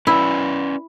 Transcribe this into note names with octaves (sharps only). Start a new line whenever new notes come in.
C#4 E4 B4 D5